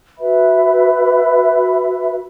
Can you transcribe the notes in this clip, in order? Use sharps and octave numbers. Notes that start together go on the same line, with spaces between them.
F#4 B4 E5 B5